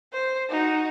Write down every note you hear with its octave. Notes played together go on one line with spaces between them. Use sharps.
C5
D#4 F#4